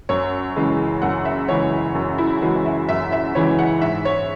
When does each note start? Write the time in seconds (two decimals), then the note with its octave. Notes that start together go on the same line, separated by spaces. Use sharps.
0.09 F#2 C#5
0.56 C#3 E3 G#3
1.02 F#2 F#5
1.25 E5
1.48 C#3 E3 G#3 C#5
1.95 F#2
2.18 E4
2.42 C#3 E3 G#3 F#4
2.66 E5
2.89 F#2 E5
3.12 E5
3.35 C#3 E3 G#3 C#5
3.59 F#5
3.82 G#2 E5
4.05 C#5